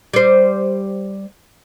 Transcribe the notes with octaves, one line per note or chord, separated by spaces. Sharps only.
G3 C5